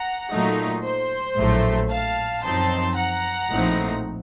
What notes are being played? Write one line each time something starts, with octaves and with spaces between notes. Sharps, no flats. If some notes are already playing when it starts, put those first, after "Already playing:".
Already playing: F#5 A#5
A#2 F#3 A3 D#4
C5
A#1 A2 F#3 A3
F5 A5
F#2 F3 C4 D#4 A5 C6
F#5 A#5
A#1 A2 F3 C4 D#4